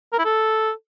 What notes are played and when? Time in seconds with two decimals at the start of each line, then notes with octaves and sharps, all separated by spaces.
0.13 A#4
0.19 E4
0.25 A4